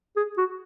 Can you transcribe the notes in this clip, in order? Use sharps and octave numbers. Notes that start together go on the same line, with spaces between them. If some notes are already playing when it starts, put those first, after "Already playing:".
G#4
F#4